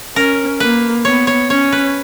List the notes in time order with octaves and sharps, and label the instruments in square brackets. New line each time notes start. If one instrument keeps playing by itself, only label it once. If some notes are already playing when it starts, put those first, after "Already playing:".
[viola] C#4 [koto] A#4
[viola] A#3 [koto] B4
[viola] B3 [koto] C#5
[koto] C#5
[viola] C#4 [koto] C#5
[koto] B4